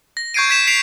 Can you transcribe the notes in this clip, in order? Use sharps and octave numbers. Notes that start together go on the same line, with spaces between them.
A#6
C#6 G6 G#6 C7 D7 D#7
G6 G#6 B6 E7
B6 C7 D7 F7